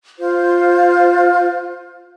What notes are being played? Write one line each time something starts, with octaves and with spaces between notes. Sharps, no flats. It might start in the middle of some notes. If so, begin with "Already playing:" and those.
F4 C5